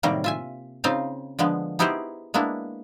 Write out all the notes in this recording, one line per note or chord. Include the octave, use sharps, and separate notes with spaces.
A2 C3 D#3 F#3 G3 A#3
F4 E5 G#5
C#3 C4 D#4 F4 C5 F5
D3 F3 G#3 B3
B3 D#4 E4 G4 G#4 C5
G#3 A#3 B3 D4 E4